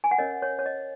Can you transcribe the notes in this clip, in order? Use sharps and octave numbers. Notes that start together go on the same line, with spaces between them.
G#5
F#5
C#4 A#4 C#5 D#5
C#5
C#5
D#5